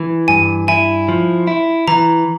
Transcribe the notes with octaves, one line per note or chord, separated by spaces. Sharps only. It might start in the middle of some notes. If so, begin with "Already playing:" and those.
Already playing: E3
G2 G#5
E4 G#5
F3
E4
E3 A#5